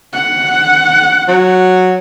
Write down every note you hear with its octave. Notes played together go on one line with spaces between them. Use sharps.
F#5
F#3